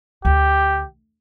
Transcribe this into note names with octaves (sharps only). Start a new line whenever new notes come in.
D2 G4